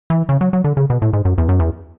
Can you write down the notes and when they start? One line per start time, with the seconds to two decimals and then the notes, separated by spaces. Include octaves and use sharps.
0.10 E3
0.29 C#3
0.41 F#3
0.53 F#3
0.64 D3
0.77 C#3
0.90 B2
1.02 A2
1.13 G#2
1.25 F#2
1.38 E2
1.49 F#2
1.59 E2